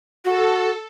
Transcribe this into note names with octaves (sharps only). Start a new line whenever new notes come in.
F#4 A4